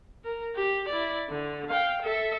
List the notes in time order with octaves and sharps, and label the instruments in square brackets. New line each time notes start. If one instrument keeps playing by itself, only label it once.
[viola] A#4
G4
E4 D5
D3
F5 G5
A4 E5